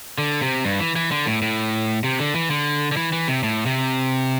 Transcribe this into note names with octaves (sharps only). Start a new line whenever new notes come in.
D3
C3
G2
E3
E3
D3
A2
A2
C3
D3
E3
D3
D3
E3
E3
C3
A2
C3